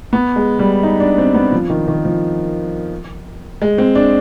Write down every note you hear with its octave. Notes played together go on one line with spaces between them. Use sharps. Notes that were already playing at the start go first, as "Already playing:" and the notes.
B3
G#3
G3
D#4
D4
C4
B3
F3
D#3
D#3
F3
G#3
C4
D4